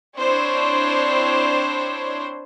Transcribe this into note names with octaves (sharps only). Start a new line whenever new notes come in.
C4 D4 E4 C5 C#5